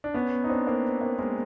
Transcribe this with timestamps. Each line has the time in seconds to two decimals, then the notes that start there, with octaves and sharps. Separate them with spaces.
0.04 D4
0.14 B3 C#4
0.44 D#4
0.49 C4 D4
0.67 A#3 C4
1.01 A#3 C4
1.19 G#3 A#3